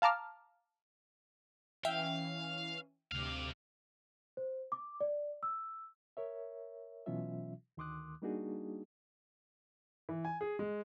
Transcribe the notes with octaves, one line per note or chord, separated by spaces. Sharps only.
F5 A5 A#5 D6 F6
E3 C#4 E5 F5 G5
D2 G2 C3 F5 D6
C5
D6
D5
E6
A#4 C#5 E5
B2 E3 F#3 C#4 F4 E5
D2 D#3 C6 D6 D#6 F#6
G3 A#3 D4 D#4 F#4 G#4
E3
G#5
G#4
G#3